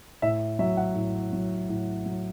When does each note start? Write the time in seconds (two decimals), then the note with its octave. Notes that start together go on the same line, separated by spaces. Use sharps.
0.22 A2 E5
0.59 F#3 E5
0.77 F#5
0.96 A2
1.33 F#3
1.69 A2
2.06 F#3